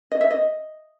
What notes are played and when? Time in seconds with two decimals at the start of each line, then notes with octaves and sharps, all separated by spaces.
0.12 D#5
0.21 E5
0.31 D#5